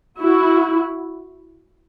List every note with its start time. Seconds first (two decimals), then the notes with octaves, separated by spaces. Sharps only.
0.19 E4 F#4